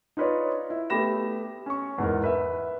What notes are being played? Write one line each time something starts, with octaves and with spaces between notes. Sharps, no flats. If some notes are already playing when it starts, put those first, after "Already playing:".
D#4 F4 B4 C#5 D5
E4
A3 B3 G4 B5 A#6 E7
C#4 C#6
E2 G#2 A#4
B4 E5